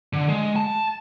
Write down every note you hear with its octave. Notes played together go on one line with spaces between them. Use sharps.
D3
G#3
A5